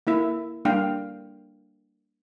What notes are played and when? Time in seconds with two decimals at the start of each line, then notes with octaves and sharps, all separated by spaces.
0.07 A#3 E4 E5
0.65 G3 A#3 D4 F5 G5